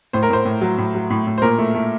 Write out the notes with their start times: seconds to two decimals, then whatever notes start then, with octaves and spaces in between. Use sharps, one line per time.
0.13 A2 C5
0.23 A#4
0.30 A2 C5
0.45 A2
0.61 F#3
0.78 A2
0.95 F#3
1.10 A2
1.27 A2
1.38 C5
1.42 A#2 A#4
1.58 A3
1.75 A3